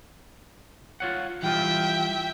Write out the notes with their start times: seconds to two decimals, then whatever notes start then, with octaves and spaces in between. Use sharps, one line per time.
1.00 F4 C#5 F#5
1.43 E3 G3 F4 E5 G5